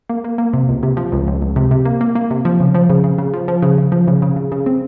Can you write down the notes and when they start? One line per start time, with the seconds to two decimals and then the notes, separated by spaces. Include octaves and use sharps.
0.09 A#3
0.24 A#3
0.38 A#3
0.54 C3
0.69 C#2
0.83 C3
0.97 F3
1.12 C#2
1.27 C#2
1.42 C#2
1.56 C3
1.71 C3
1.85 A#3
2.01 A#3
2.15 A#3
2.31 C3
2.45 F3
2.60 C#3
2.75 F3
2.90 C#3
3.04 C#3
3.18 C#3
3.34 F3
3.48 F3
3.62 C#3
3.78 C#3
3.92 F3
4.08 C#3
4.22 C#3
4.36 C#3
4.52 C#3
4.66 C4